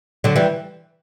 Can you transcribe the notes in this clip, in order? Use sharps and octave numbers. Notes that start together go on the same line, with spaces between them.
D3 F#3
E3 G3